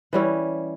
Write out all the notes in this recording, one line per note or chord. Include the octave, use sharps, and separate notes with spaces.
E3 G3 C#4 E4